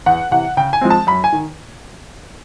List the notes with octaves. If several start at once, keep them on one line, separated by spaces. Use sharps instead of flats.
E2 F#5
C3 E3 F#5
C#3 G5
G#5
F3 G#3 C4
A5
F#2 B5
G#5
D#3